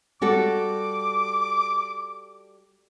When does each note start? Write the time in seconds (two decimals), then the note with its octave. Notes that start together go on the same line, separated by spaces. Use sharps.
0.21 G3 F#4 A4 D6